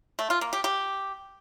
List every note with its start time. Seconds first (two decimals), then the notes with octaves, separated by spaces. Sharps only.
0.19 A3
0.30 F4
0.41 A#3
0.53 G4
0.64 G4